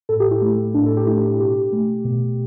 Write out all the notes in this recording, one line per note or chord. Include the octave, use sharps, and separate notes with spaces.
A2 A4
G4
E4
A3
A2 D4
A4
G4
A3 E4
B2 G4
A3
B2